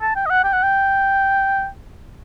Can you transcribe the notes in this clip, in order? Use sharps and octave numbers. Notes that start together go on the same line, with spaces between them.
A5
G5
D#5
F#5
G5
F#5
G5